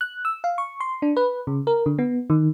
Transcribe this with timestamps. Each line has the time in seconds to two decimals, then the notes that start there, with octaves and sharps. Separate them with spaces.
0.01 F#6
0.25 E6
0.44 F5
0.58 C#6
0.80 C6
1.02 D4
1.17 B4
1.47 C#3
1.67 A#4
1.86 D3
1.99 B3
2.30 D#3